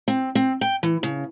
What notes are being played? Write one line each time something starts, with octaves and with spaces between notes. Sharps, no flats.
C4
C4
G5
E3
C#3